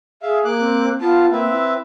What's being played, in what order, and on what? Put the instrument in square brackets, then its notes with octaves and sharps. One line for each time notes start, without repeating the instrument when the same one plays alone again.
[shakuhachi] G#4 [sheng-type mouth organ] E5 F5
[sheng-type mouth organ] A#3 D6 F#6
[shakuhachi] C4
[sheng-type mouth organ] B3 A5 [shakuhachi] F4
[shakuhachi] A#3 [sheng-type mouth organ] C4 B4 E5
[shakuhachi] E4